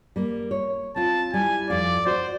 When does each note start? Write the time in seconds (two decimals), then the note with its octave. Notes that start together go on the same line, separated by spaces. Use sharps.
0.16 G3 A#3
0.51 C#5
0.96 C4 F4 A5
1.34 G3 E4 G#5
1.70 F2 D5 F5
2.06 F#4 C5 D5